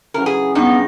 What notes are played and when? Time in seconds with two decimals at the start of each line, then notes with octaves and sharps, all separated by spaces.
0.14 C#3 E3 F#3 A#4
0.26 G#4
0.55 G2 B3 D#4